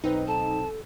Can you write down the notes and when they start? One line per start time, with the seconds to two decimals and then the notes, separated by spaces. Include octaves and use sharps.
0.04 B1 C4 D#4 B4
0.28 A4 A5